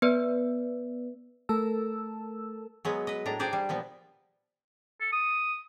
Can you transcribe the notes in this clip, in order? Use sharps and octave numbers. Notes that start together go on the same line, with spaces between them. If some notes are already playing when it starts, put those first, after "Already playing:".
B3 B4 D5
A3 A4 A#4 A5 E6
F#3 G#3 B3
B4 D#5
A2 D4 A#5
G4 G#4 C5 D5
G3
A#2 F3 B3
A4
D#6